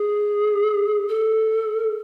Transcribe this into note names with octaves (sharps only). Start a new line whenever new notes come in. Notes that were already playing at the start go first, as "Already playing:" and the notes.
Already playing: G#4
A4